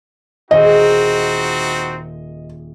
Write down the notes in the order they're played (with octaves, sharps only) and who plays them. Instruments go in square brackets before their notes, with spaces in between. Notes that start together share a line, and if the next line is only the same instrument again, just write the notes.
[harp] D#1 G#4 [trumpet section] C4 D#4 F#4 [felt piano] D#5